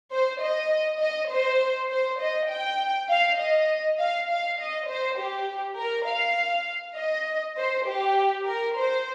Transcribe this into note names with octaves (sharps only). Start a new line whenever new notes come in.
C5
D#5
D#5
C5
C5
D#5
G5
F5
D#5
F5
F5
D#5
C5
G4
A#4
F5
D#5
C5
G4
A#4
C5